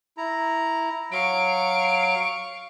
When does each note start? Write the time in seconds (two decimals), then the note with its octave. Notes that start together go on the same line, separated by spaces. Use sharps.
0.17 E4 A#5
1.12 F#3 F5 C#6 D7